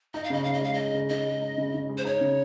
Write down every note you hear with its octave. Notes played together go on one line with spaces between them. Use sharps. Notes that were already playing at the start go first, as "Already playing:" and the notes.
D#4 D#5
F5
C#3 D#5
C#3 F5
D#5
G#3 F5
D#4 D#5
C#3
C#3 D#5
G#3
D#4
C#3
C#3
G#3
C5
D#4 C#5
C#3